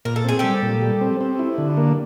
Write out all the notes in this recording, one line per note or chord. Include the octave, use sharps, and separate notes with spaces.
A#2 A#4
A4
C4 G#4
G3 G4 A4
A#2
G3
C4
C4
E4
D3
A#3